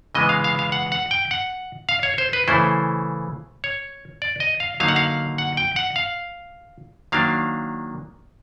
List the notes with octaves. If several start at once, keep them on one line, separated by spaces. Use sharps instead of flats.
C#3 E3 G#3 B3 D#5
F5
F5
F5
F#5
F#5
G5
F#5
F5
C#5
C5
B4
C#3 E3 A3 C#4 E4 C5
C#5
D5
D#5
F5
D3 F#3 A#3 D#4 F5
F#5
F5
F#5
G5
F#5
F5
D#3 F#3 A#3 D4 F5